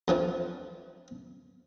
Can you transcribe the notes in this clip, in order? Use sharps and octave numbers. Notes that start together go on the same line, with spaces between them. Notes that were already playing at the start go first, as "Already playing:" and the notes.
F2 E3 F3